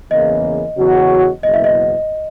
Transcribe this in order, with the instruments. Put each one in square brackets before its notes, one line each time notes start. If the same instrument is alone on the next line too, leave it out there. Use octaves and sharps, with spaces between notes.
[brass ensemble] E2 C#3 E3 A#3 [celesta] D#5
[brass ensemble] E2 C#3 F#3 C#4 F#4
[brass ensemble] F#1 E2 B2 [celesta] D#5
[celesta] E5
D#5